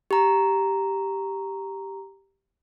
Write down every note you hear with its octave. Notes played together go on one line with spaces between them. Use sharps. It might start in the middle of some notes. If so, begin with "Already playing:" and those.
G4 A#5